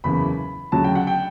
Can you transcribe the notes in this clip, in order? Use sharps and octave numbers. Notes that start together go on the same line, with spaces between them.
F#1 E2 C#3 B5
D2 C#3 F#3 A5
G5
F#5
G5